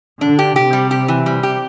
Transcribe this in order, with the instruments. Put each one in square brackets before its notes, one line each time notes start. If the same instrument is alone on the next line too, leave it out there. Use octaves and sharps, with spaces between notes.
[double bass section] D3 [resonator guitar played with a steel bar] D4
[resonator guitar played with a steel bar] G4
[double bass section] C3 [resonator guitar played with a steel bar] G4
[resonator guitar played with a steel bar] G3
G4
E3
G3
G4